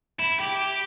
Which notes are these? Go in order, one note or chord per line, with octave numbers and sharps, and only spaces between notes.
E4
G4